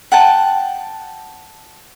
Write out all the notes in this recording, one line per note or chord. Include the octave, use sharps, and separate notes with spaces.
F#5 G5 A5